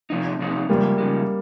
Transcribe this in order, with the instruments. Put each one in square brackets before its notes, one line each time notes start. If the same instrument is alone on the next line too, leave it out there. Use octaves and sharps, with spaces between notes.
[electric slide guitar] C3 F3 C4 D#4
C3 F3 C4 D#4
[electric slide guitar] C#3 F3 G#3 [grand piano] G3 A#3
[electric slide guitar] C#3 F3 G#3